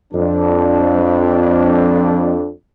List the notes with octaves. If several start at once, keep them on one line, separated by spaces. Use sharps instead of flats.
F2 D4